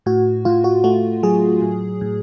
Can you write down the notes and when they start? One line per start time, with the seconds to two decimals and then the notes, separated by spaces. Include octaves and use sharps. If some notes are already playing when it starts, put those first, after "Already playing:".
0.06 A2 F#4
0.45 A2 F4
0.64 F#4
0.84 A3 F#4
1.23 F#3 G#4
1.62 A2
2.01 A2